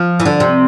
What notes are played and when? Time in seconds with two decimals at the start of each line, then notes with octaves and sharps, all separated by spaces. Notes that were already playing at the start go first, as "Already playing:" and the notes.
Already playing: F3
0.20 E3
0.25 D3
0.40 C3